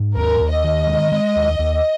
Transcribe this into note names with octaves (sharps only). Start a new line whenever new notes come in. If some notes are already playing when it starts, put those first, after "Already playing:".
Already playing: G#2
D#2 A#4
D#2
D#5
D#3
G#3
G#3
D#2
D#2